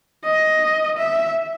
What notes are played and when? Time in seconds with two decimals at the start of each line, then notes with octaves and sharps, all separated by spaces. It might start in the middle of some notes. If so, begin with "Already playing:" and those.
0.25 D#5
0.97 E5